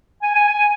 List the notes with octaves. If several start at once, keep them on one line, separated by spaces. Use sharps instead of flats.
G#5
G#5
G#5